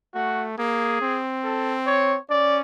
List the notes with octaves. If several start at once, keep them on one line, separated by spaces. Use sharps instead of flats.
A3 F#4
A#3 G#4
C4
A4
C#5
C#4 D5